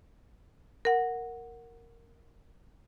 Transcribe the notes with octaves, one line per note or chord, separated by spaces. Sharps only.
A#4 F#5